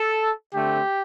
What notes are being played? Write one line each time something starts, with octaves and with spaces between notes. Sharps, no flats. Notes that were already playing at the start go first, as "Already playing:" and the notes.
Already playing: A4
D3 A3 C4 G4